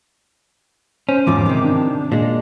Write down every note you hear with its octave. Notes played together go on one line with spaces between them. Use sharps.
C#4 C5
E2 G#2 F3 D6
C3 D#3
D4
A#2 G#3